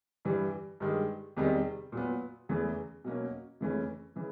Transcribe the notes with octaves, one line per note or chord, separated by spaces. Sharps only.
G2 E3 G3
G2 D#3 G#3
E2 C3 D#3 G3
A#2 F#3 B3
E2 C#3 E3 A3
B2 F#3 A#3 C#4
F2 C#3 E3 A3 C#4
C#3 E3